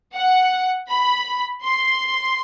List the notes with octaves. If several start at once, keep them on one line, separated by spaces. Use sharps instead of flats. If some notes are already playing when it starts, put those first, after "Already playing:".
F#5
B5
C6